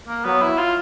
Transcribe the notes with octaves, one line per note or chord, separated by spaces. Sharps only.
A#3
F#3 B3
E4
F4